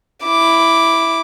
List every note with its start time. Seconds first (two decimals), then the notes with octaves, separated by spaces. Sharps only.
0.24 E4 D6